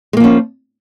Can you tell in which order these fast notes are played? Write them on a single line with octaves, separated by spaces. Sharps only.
G#3 A#3 F3 C#4